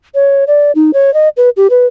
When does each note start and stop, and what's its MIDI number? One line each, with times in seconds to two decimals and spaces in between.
0.15 0.44 73
0.47 0.72 74
0.75 0.91 63
0.94 1.13 73
1.14 1.29 75
1.37 1.49 71
1.57 1.68 67
1.70 1.86 71